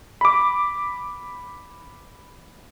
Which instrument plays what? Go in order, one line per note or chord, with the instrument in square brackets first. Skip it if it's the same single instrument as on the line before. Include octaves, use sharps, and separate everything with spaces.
[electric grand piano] B5 D6